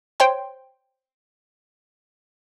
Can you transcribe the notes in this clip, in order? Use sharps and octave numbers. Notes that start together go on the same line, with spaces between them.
C5 C#5 G5 C6